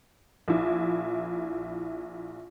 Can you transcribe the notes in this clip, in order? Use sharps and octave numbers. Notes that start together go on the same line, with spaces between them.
A#1 E4